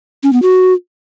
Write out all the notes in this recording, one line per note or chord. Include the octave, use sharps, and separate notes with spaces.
C#4
B3
F#4